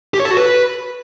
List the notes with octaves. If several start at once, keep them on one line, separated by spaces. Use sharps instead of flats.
G4
C#5
A4
F#4
B4